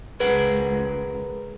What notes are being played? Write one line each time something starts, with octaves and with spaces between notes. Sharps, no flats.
C#2 G#4 A#4 B4 F#5